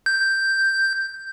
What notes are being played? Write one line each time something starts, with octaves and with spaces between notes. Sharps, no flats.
G6